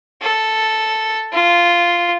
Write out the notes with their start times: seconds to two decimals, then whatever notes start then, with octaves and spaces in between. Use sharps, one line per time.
0.22 A4
1.33 F4